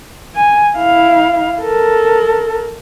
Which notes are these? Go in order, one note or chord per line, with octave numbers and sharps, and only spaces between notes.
G#5
E4 F5
A4 A#4